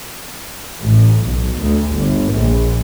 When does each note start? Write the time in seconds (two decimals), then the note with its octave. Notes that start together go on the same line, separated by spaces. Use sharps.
0.82 A1
1.26 B1
1.61 D2
1.94 G1
2.34 A#1